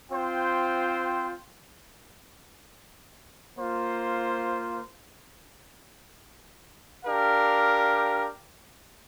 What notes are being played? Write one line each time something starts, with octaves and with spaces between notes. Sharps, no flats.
C4 F4 C5 G5
A#3 F4 C5
D4 G4 A#4 F5